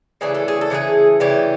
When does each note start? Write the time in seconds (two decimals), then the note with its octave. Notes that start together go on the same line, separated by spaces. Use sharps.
0.21 C#3 E3 A3 D4 G#4
0.35 A4
0.48 G#4
0.61 A4
0.70 C#3 E3 A3 D4 G#4
1.20 C#3 E3 A3 D4 G4